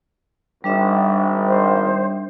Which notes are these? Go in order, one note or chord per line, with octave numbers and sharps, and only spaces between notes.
G#1 G3 D4 E5
C5